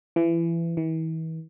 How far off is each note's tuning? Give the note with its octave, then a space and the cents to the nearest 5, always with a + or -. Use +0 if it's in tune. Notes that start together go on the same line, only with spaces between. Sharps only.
E3 +25
E3 -40